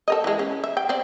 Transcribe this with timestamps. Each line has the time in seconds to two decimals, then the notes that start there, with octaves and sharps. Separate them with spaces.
0.08 A4 A#4 D#5
0.24 E3 G#3
0.39 C#4
0.64 E5
0.77 G5
0.89 C4 D5